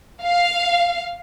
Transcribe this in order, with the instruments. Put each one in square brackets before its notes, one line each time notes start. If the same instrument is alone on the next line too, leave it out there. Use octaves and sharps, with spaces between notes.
[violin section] F5